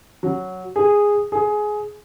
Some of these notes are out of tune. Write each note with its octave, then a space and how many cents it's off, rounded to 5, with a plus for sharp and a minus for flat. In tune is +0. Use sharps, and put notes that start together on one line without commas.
F#3 +0
G#4 -10
G#4 +15